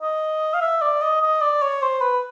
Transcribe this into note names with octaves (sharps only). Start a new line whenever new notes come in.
D#5
F5
E5
D5
D#5
D#5
D5
C#5
C5
B4